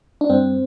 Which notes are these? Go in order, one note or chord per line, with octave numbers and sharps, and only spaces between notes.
D4
G2 C4